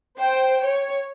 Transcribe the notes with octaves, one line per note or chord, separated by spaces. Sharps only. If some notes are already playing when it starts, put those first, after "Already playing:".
C5 G5
C#5